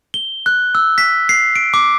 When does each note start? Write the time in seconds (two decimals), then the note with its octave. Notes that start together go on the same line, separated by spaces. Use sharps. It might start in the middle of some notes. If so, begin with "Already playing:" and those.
0.14 G7
0.46 F#6
0.75 E6
0.98 B6
1.29 C7
1.56 D7
1.74 D6